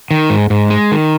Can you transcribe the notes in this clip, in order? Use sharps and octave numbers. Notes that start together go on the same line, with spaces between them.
D#3
G#2
G#2
G#3
D#3